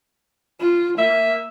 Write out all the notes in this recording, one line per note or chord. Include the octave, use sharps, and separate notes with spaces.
F4
A#3 E5